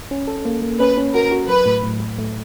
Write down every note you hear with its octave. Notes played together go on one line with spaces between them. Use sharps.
C#4
A4
A#3
A#3
C#4 B4
C#4
F#4 A#4
F#4
F#3 B4
A2
A2
A2
A3